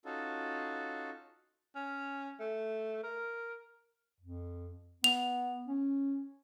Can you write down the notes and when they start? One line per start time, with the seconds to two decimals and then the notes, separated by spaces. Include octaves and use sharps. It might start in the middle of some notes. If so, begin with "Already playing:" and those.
0.05 C#4 D#4 F4 F#4 A4
1.75 C#4
2.40 A3
3.04 A#4
4.20 F2
5.04 B3 F7
5.68 C#4